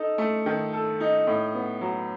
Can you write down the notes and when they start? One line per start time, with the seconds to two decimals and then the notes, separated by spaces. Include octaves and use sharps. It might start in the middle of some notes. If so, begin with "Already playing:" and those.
Already playing: D#4 A4
0.18 A3
0.46 D#3
0.73 A4
1.00 D#4
1.27 A2
1.55 B3
1.81 F#3